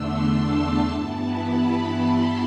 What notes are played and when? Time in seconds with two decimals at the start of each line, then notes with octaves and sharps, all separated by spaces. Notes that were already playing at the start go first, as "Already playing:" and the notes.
Already playing: E2 D3 A3 D4 C6 E6
0.20 A5
0.89 G2 E3 B3 E4 A5
1.25 B5
1.94 C6